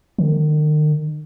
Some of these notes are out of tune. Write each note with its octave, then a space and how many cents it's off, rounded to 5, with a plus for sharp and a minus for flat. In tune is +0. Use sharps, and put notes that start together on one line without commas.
D#3 -40